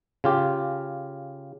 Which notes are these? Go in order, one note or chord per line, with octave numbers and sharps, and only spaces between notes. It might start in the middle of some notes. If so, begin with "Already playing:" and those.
C#3 F4 G4